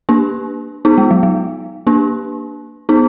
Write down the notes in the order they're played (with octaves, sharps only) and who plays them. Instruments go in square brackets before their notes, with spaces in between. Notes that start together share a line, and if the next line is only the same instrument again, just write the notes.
[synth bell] A#3 D4
B3 D#4
G#3
F#3
F#3
A#3 D4
B3 D#4